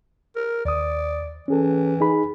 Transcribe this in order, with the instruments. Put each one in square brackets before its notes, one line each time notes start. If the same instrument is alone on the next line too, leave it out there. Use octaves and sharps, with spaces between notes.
[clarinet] A#4
[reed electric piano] D#2 D#6 [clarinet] D5
[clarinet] E3 [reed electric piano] C#4 G#4 A4
[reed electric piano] D#4 G#4 B5